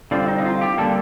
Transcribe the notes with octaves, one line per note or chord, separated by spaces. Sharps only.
D3 G3 C4 F4
D#4
D#4
F4
G4
D3 G3 A#3 A4